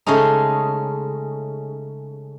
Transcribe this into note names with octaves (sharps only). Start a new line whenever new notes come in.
C#3 G#3 A3 C#4 D#4